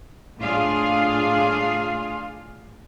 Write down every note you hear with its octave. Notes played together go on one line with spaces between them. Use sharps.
A2 D4 F4 G#4 F5